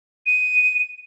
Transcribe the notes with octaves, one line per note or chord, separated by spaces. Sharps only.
D#7